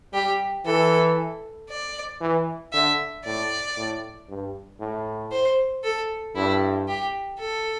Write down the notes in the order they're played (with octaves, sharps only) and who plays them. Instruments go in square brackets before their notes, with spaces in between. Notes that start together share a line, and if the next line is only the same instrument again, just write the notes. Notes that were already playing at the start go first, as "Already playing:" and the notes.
[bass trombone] G3 [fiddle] G4
[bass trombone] E3 [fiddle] A4
[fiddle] D5
[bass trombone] E3
[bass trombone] D3 [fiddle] E5
[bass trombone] A2 [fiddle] D5
[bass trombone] A2
G2
A2
[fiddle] C5
A4
[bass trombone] G2 [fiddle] E4
[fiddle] G4
A4